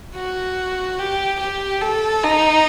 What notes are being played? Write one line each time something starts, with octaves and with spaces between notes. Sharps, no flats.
F#4
G4
G4
A4
D#4